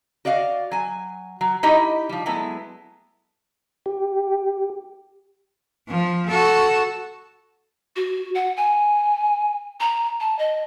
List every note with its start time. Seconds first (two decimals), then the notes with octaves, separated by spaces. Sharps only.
0.25 F#4 D5 D#5 F5
0.72 F#3 G#5
1.41 F#3
1.63 D#4 E4 G4 D#5
2.09 F3 G3
2.26 F#3 G#3 A3 B3 E4
3.86 G4
5.89 F3
6.28 F#4 A4
7.96 F#4
8.35 F#5
8.57 G#5
9.80 A#5
10.20 A5
10.39 D#5